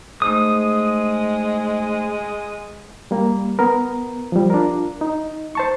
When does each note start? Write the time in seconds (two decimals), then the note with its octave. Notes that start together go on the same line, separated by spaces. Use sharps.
0.22 G#3 A3 D#4 C5 D#6
3.11 G3 A#3
3.59 B3 A#4
4.32 F3 G3
4.50 D4 F4 A#4
5.01 D#4
5.55 C5 A5 C#6